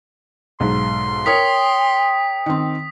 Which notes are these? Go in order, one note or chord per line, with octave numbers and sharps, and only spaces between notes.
B1 G#2 C6
A#4 C#5 G5 D#6 B6
D#3 C4